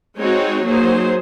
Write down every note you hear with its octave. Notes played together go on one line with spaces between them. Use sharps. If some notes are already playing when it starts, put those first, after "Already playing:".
G#3 C4 D#4 F#4 C#5
F#3 A#3 D#4 G#4 C5